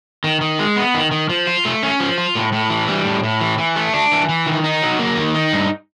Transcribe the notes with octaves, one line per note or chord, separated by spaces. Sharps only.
D#3
D#3
G#3
B3
D#3
D#3
F3
F4
A3
C#4
F3
F4
A2
A2
E3
G3
A2
A2
E3
E3
A3
D4
E3
E3
D#3
D#4
F#3
A#3
D#3
D#4
G2